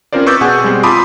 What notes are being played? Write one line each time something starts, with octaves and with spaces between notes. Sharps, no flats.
C4 C#4 F4 A#4 C5 D5
B4 C#6 D6 E6 G6 A6
B2 G#4 F#5 G#5 C#6
G3 G#3 C4
F4 A5 B5 C6 D6 D#6